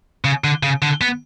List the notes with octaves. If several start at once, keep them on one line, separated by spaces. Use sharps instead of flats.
C#3
D3
C#3
D3
B3